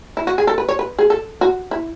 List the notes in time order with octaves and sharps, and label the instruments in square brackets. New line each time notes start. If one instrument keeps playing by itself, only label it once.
[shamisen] E4
F#4
G#4
A4
B4
C#5
B4
G#4
A4
F#4
E4